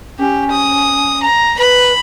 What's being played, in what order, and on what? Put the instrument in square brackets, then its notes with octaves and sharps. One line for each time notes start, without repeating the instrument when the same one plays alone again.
[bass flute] C#4 [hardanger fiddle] G4
[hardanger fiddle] D#6
A#5
[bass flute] B4 [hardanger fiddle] B5